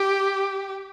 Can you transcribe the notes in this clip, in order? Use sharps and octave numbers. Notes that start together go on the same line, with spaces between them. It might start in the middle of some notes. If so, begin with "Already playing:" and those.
Already playing: G4